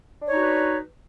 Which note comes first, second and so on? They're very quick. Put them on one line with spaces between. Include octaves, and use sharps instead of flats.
D4 C#5 D#4 F#4 B4